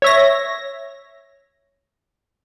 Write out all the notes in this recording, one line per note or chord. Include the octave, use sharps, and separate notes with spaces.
C#5 E5 A#6